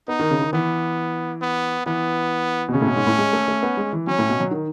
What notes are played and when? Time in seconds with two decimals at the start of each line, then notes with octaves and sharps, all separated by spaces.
0.08 B3 D#4
0.20 D#3
0.31 C#3
0.41 D#3
0.53 E3 B3
1.41 B3
1.86 E3 B3
2.69 B2
2.74 C#3 C#4
2.81 A2
2.86 B2
2.96 G#2
3.07 A2
3.18 G#3
3.33 A3
3.48 A3
3.63 B3
3.77 G#3
3.93 E3
4.07 F#3 C#4
4.19 A2
4.29 B2
4.40 F#3
4.51 D#3